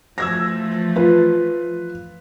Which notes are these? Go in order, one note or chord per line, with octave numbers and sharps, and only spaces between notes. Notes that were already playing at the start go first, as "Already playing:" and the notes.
E3 F3 A3 E6 G#6 A#6
F4 B4